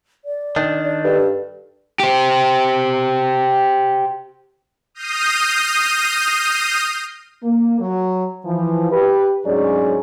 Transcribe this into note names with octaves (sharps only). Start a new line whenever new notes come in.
D5
D#3 D4
D5
G2 A4
G4 C5
D#6 F6 G6 A#6 C7 D#7
A#3
F#3 F#4
E3 F3
G4 B4
D2 G#2 F#3 C#4 G#4 D5